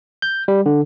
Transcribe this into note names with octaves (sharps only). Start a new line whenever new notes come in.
G6
G3
D3